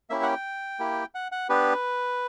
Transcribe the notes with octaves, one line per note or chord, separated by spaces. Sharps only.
A#3 C#4 E4 G4 E5
F#5
G5
A#3 E4 G4
F#5
F#5
B3 D4 G4 B4